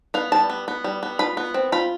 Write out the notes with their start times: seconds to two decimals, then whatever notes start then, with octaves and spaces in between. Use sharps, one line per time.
0.14 B3 F5
0.32 G3 A5
0.50 B3
0.68 B3
0.84 G3
1.03 B3
1.19 F4 B5
1.37 B3
1.54 C4
1.72 F4 B5